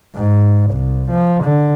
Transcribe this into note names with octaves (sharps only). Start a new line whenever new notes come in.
G#2
C2
F3
D3